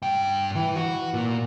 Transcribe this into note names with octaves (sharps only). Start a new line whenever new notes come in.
G2 G5
E3
F#4
A#2